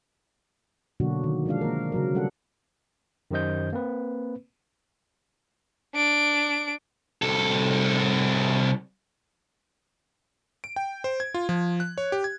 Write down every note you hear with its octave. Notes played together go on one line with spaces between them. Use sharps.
B2 D3 F#3 A#3 D4 F#4
D#3
F3 G#3 D4 F5
A#3 A#4
C#3 F#3 A#4
G3 D4 A4 F#5
F#2 D#3 G4 C5 D#5 G6
A#3 C4 B4
D4 D7
C2 A4
D7
G5
C5
G#6
F4
F3
F#6
C#5
G4
G#6